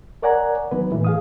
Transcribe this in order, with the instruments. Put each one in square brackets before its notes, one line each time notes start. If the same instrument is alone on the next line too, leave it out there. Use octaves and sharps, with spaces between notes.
[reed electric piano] A#4 C#5 D5 F#5 G#5 A#5
D#3 F#3 B3 B4
A2 E3
G#4 F5 D#6